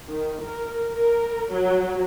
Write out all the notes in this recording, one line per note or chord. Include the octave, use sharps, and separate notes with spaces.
D#3
A#4
A#4
F#3